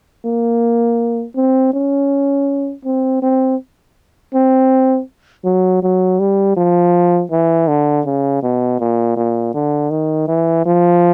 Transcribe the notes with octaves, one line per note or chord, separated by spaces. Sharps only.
A#3
C4
C#4
C4
C4
C4
F#3
F#3
G3
F3
E3
D3
C#3
B2
A#2
A#2
D3
D#3
E3
F3